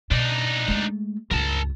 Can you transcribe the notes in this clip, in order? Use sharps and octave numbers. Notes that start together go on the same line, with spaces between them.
B2 D4 D#4
G#3 A3
C#2 G2 A#4 A5